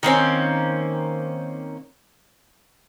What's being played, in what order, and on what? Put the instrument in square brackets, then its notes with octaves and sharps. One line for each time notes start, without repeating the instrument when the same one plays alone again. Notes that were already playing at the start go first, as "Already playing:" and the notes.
[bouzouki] D#3 A#3 C4 C#4